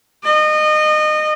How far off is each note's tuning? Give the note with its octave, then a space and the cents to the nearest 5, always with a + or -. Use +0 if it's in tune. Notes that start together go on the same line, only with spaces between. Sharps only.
D#5 -25